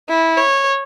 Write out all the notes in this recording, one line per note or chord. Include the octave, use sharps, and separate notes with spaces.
E4
C#5